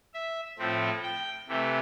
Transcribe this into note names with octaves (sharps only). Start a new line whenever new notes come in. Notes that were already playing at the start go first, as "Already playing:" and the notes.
E5
A2 F3 A3 C4
G5
C3 E3 A3